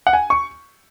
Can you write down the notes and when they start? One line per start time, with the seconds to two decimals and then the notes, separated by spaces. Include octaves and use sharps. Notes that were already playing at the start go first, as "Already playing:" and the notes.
0.07 F#5
0.13 G#5
0.30 C#6